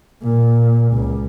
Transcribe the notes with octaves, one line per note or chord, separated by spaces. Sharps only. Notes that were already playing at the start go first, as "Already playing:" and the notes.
A#2
C#2